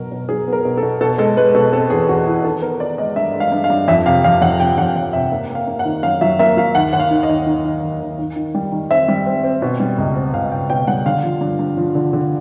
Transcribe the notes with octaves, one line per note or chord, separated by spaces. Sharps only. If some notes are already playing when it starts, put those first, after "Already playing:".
Already playing: B2 F#3 A#4
B2
F#3 G#4
B3
A#4
B2
A4
B2
B2 A4
G#3 A4
G#3 B4
B2 A4
C4 A4
E2 G#4
E2 F#4
E2 E4
D#3 A4
B3 A#4
B3 D5
G#3 D#5
G2 E5
G#3
F5
G2
F5
G2
F2 E5
C3 F5
F2 F5
F2 F#5
C3 G5
F2 F#5
F2 F5
C3 E5
A#3 E5
A#3
F5
A#3
F#5
D#3
F#2 F5
F#3 E5
A#3 E5
F#3 F5
D#2 F#5
D#2 F#5
F5
D#3
D#5
D#2
D#3
D#3
D#2
D#2
D#3
D#3
G3
D#3
C4 E5
G3
C4
C4
B2
G3
C#2
C4
C#2 F5
C#2 G5
B2 G5
G3 F#5
D3 F5
F3
G2
G2
F3
D3
D3